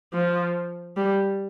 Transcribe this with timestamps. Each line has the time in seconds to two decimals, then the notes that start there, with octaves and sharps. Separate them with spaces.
0.14 F3
0.97 G3